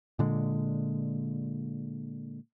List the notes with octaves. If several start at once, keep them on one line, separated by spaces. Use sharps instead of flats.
A#2 D3 G#3